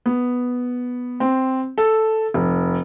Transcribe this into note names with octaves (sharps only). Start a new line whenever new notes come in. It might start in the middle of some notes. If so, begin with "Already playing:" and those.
B3
C4
A4
F1